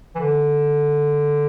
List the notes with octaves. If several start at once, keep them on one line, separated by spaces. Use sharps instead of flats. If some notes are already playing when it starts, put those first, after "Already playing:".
E3
D3